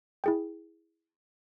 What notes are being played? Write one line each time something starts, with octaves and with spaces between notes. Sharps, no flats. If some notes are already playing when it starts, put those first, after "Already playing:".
E4 G#4 G5